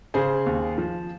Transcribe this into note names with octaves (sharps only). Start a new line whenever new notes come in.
C#3 G#4 C5
D#2
F3